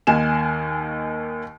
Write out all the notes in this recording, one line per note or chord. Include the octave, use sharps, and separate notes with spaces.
D#2 D#3 A#3 G#5 E7